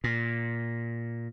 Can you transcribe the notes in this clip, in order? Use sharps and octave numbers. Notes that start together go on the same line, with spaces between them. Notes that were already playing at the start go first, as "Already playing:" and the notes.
A#2